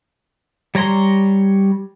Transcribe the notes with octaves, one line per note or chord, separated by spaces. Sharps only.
G3 C#5 A#5 C6